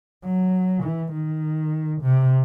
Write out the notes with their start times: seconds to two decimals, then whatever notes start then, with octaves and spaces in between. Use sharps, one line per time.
0.24 F#3
0.83 E3
1.13 D#3
2.02 C3